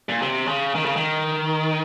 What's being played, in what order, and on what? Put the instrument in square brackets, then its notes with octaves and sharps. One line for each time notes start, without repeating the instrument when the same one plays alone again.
[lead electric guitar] A#2
C3
C#3
D#3
C#3
D#3